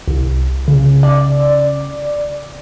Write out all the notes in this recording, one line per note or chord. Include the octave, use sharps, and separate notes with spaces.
C2
C#3
D5